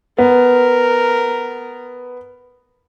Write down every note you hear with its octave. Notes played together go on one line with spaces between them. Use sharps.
B3 A#4